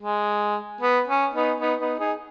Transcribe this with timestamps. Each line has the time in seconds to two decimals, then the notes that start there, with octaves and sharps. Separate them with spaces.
0.01 G#3
0.81 B3
1.08 C#4
1.34 B3 D#4
1.60 B3 D#4
1.80 B3 D#4
1.99 D#4 G#4